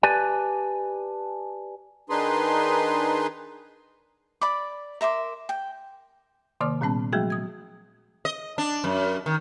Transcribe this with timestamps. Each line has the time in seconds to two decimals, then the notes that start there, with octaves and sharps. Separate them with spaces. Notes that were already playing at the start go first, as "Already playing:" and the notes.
0.03 G4 B4 D5 G#5 A5
2.10 D#3 D4 D#4 G#4 B4 C6
4.41 D5 B5 D6
5.01 A#4 E5 C6 D6
5.49 G5
6.61 C3 D#3 A#3 D5 D6 F6
6.81 A#2 G3 B3 C#4 A5
7.13 F3 F#3 G#3 A3 F#4 G#4
7.30 D#6 G#6
8.25 D#5
8.58 D4
8.84 F#2
9.26 D#3